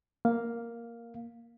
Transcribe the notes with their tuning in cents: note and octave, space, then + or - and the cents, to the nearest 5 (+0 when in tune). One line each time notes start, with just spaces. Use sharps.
A#3 +0 F5 +0